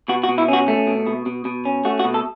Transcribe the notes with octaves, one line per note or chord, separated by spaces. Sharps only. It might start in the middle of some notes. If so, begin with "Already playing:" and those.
B2 F#4
F#4
B2
E4
C#4 F#4
A3
B2
B2
B2
B2
C#4
A3 F#4
F#4
B2
A4